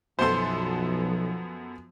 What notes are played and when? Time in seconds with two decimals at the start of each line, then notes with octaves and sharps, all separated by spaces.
0.19 B1 F#2 F3 B3 A4 C5 C6